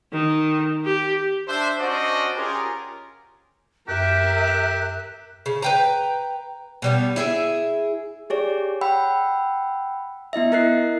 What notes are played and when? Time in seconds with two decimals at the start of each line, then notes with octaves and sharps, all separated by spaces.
0.13 D#3
0.85 G4
1.47 D4 C5 E5
1.80 C#4 D4 F#4 C5 D5 D#5
2.36 C#4 F4 G4 G#4 A#4
3.88 F#2 G4 A#4 E5 F#6
5.46 C#3
5.62 B4 G5 A#5
6.82 B2 G3 B3
7.16 E4 G#4 E5
8.30 G4 G#4 C#5 D5
8.81 F#5 G5 B5 E6
10.33 B3 E4 D#5 E5
10.52 E4 A#4 D#5 F#6 C7